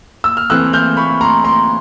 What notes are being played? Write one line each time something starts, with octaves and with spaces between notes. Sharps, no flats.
E6
F6
E3 A3 C4 E6 F#6
F6 G6
B5 C#6
A#5 C6
A#5 C6